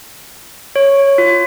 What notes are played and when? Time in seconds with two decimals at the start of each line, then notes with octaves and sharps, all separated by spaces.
0.76 C#5
1.18 F4